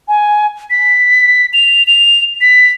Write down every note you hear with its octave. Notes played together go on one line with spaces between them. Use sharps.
G#5
B6
F7
F7
B6